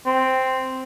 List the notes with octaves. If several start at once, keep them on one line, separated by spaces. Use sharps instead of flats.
C4